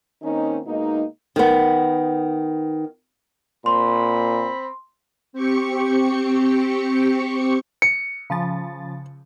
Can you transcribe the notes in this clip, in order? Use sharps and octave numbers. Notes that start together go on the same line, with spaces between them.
D#3 A#3 C4 C#4 D#4
B2 G#3 A#3 D#4
D#3 B3
A#2 C4 B5 C6
C4 G4 C#6 C#7
C#7
C#3 F3 A6